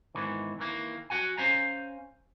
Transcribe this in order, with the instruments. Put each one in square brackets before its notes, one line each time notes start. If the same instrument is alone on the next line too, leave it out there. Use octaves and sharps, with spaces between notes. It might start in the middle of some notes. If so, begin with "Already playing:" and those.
[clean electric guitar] E2 G#2 D#3 E3
D#3 E3 A#3
F#4 F#5 G#5
C#4 C5 F5 G#5 A#5